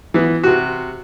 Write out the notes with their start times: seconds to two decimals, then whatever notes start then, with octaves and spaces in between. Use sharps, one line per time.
0.14 E3 B3
0.43 C3 F#4